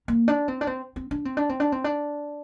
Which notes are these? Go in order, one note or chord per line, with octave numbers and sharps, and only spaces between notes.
A#3
D4
C4
D4
C4
C4
D4
C4
D4
C4
D4
C4
D4